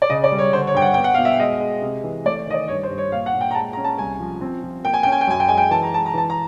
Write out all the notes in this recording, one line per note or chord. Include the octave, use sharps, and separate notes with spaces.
D5
C#3 D#5
D5
G3
C#5
D3 C5
C#5
G2 G5
F#5
B3 G5
F#5
B2 F5
E5
G#3 D#5
G#3
C3
E3
A3 D5
D#3 D#5
D5
G2 C#5
C5
G2
C#5
A#2 F5
F#5
A#2
G5
A#5
G#3 A5
C#4 A#5
A5
C2 G#5
F3
C4
F3
A#3 G5
G#5
C#4 G5
G#5
G5
F#2 G#5
G5
G#3 G#5
G5
E3 A5
A#5
G#3 A5
A#5
E3 A5
A#5